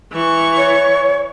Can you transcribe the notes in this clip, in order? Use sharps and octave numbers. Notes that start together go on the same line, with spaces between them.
E3 C#6
C#5